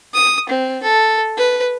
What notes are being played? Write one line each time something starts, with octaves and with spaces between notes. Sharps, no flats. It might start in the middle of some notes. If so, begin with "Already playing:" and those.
D#6
C4
A4
B4